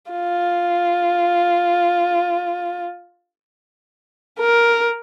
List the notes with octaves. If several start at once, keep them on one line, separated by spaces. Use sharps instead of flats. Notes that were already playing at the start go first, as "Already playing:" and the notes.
F4
A#4